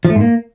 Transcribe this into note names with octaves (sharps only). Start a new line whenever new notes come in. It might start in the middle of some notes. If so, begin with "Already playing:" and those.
F3
A3
G#2
A#3